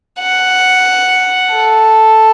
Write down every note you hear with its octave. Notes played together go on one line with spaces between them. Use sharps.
F#5
A4